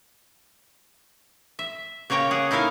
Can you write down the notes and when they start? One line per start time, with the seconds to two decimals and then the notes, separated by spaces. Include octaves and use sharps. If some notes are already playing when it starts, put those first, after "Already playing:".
1.59 E5
2.10 C#3 A#3 C#5 G5 A#5
2.31 G#4 F#5
2.51 D#4 E4 A4 A#4 F5